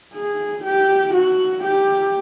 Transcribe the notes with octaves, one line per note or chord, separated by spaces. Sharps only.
G#4
G4
F#4
G4